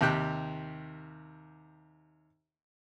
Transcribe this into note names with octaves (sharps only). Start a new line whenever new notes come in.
D#2 C3 G4 G5 F#6